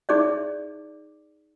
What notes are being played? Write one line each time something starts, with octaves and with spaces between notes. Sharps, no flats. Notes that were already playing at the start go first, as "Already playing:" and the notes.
D#4 G#4 D5 E5